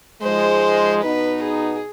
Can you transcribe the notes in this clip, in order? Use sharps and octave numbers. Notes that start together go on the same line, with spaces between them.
G#2 F3 G#3 C5
B2 B3 D#4 B4
G#4